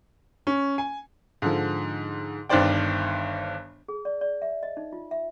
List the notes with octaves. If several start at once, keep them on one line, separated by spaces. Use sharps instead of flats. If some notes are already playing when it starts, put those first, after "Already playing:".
C#4
G#5
G#2 D3 F3
G1 G2 D#3 C5 D5 G5
G#4
D5
D5
E5
D#5
D#4
F4
E5